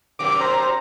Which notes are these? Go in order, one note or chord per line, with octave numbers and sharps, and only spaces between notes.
F#2 C3 D#3 D6
C5 A#5